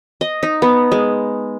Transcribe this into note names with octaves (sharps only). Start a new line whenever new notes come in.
D#5
D#4
B3
G#3